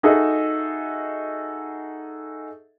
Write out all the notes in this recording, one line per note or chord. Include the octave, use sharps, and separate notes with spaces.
D#4 F#4 G#4 A4 D#5 E5